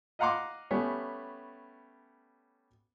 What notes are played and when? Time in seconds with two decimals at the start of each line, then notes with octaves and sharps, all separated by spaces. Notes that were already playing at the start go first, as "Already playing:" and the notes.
0.19 D#5 F5 F#5 A#5 C6 D6
0.71 G3 A3 B3 C#4